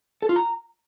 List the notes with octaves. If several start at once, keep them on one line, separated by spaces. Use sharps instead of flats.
A4
F4
A#5